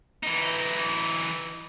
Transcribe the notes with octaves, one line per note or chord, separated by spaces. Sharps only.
E3 D#4